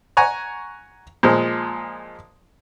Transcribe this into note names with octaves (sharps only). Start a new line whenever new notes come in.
F#5 G#5 A#5 C#6
A#2 F3 G#3